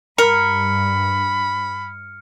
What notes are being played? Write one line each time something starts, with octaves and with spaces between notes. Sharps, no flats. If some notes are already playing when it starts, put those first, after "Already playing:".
G2 A#4 B5 F6 C#7